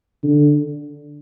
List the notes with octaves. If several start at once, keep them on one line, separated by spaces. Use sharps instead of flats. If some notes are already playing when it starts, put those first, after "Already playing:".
D3